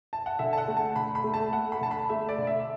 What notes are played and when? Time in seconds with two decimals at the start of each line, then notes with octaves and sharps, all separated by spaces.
0.13 A5
0.26 F#5
0.39 D3 E5
0.53 A5
0.58 F#5
0.68 A3
0.77 A5
0.96 D3 B5
1.15 B5
1.24 A3
1.34 A5
1.52 A3 F#5
1.72 B5
1.81 D3 A5
1.91 B5
2.09 A3 E5
2.29 D5
2.38 D3
2.47 E5